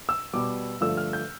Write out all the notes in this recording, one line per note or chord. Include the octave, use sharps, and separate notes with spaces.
E6
B2 G3 D6
G2 D3 F3 A3 E6
F6
G6